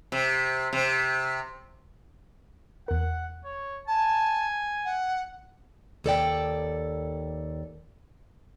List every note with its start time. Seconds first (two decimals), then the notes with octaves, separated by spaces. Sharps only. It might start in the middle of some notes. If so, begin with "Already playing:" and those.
0.12 C3
0.73 C3
2.88 E2 A#4 F#5
3.45 C#5
3.88 G#5 A5
4.85 F#5
6.04 D#2 A4 D5 G5